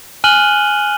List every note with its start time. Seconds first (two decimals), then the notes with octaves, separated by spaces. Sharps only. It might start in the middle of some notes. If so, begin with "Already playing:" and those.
0.24 G#5 F6 F#6 D#7 F#7 G7